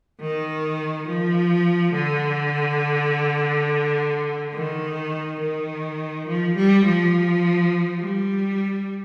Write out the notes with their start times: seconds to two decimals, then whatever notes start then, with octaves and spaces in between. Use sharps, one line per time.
0.21 D#3
1.08 F3
1.94 D3
4.54 D#3
5.40 D#3
6.28 F3
6.56 G3
6.86 F3
8.00 G3